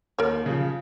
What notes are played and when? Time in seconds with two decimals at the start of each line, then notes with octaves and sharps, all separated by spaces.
0.18 D#2 A#4 C#5
0.46 C#3 F3